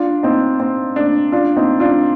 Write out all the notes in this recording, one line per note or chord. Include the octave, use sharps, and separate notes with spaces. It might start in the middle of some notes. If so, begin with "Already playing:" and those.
Already playing: D4 F4
C4 D#4
C4
D4
D4 F4
C4 D#4
D4 F4